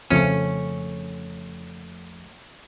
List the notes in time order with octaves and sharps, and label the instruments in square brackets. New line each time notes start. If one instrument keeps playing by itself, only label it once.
[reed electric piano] F2 F3 A3 [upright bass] C#3 C4 [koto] C#4